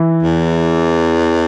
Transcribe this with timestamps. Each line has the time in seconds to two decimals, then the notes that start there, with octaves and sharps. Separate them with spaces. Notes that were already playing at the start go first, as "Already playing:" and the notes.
Already playing: E3
0.23 E2